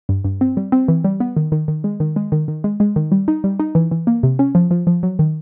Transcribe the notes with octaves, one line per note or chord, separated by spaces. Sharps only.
G2
G2
C4
G3
C4
E3
G3
B3
D#3
D#3
D#3
G#3
D#3
G#3
D#3
D#3
G#3
G#3
D#3
G3
D#4
G3
D#4
E3
E3
A#3
C3
C#4
F3
F3
F3
F#3
D#3